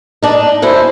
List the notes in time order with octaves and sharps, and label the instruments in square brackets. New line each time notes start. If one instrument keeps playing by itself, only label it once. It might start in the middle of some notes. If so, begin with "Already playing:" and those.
[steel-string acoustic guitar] D4 D#4
[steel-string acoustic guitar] F#2 D#4 E4 [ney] C5